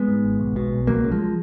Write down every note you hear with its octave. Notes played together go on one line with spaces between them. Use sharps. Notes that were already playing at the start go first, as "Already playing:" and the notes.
Already playing: G#3 B3
G#2
G#1
B1
B2
B1
C#2 F#3 A#3
C#3
F3 G#3